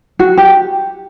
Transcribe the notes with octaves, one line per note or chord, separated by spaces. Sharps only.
F#4
G4